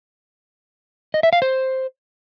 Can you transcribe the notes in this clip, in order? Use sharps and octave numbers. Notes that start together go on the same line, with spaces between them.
D#5
E5
F5
C5